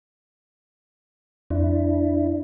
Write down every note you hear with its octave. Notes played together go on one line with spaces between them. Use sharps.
F2 D4 E4